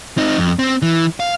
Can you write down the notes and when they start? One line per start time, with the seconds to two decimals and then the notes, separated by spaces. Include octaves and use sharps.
0.18 C4 D#4
0.37 F2
0.59 C4
0.82 E3
1.20 F5